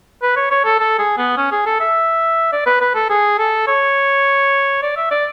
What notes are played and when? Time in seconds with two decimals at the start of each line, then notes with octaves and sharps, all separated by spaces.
0.23 B4
0.36 C#5
0.51 C#5
0.65 A4
0.80 A4
0.99 G#4
1.18 B3
1.37 C#4
1.52 G#4
1.66 A4
1.80 E5
2.53 D5
2.66 B4
2.81 B4
2.95 A4
3.10 G#4
3.39 A4
3.67 C#5
4.82 D5
4.97 E5
5.11 D5